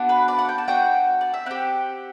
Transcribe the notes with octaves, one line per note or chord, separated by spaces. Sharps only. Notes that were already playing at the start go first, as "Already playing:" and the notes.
Already playing: B3 D4 F#4
B4
D5
F#5
G5
A5
B3 D4 F#4 G5
D5
E5
C4 G4 F#5